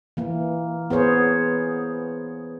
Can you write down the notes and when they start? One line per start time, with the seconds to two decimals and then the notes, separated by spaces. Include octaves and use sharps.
0.17 E3 A#3
0.90 B3 G#4 C5 C#5